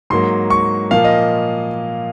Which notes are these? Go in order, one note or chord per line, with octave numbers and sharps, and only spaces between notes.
G#2 F#3 A#3 C6
C#6
A#2 F3 A#3 F5
D#5